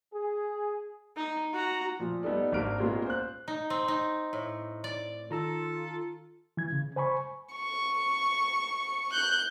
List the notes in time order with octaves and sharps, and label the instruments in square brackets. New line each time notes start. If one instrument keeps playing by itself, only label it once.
[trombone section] G#4
[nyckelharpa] D#4
F#4 A#5
[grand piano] A#2 F3
G3 B3 D#4 A4 D5
G#1 A#3 D4 F6 D7
A#2 G#3 A#3 B3 C#4 F4
C5 F#6
[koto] D#4
C4
D#4
A2
D5
[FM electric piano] D#3 A#5 E6 [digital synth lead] F4 [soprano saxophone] A4
[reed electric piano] E3 G#6
C#3
C5 G#5 B5 C#6
[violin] C#6
F#6 G6